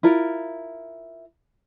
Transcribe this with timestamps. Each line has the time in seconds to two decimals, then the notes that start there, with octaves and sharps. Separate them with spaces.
0.03 E4 F4 A#4